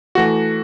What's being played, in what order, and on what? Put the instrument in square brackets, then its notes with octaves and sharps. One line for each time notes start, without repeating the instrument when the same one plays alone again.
[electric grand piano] E3 A3 F#4